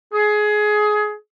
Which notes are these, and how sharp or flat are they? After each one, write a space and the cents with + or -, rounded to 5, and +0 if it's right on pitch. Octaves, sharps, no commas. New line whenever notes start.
G#4 +20